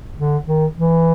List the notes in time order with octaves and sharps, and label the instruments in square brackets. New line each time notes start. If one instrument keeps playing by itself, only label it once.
[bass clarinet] D3
D#3
E3